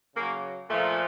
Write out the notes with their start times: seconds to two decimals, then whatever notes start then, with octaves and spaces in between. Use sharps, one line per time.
0.15 C#3 F#3 A#3
0.69 A#2 F3 A3